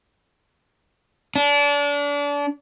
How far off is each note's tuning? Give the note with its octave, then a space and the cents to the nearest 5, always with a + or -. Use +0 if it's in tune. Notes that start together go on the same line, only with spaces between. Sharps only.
D4 -30